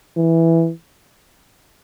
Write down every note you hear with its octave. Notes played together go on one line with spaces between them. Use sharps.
E3